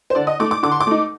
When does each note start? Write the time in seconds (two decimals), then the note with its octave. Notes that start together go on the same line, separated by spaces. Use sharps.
0.10 C5
0.15 D3 D5
0.27 D#5
0.40 A3 D#4 D6
0.51 D6
0.63 D3 D6
0.71 C6
0.80 D6
0.87 A3 D#4